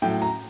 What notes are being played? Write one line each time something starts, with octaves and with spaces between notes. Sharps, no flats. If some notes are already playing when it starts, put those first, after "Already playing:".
A2 F#3 G5
A#5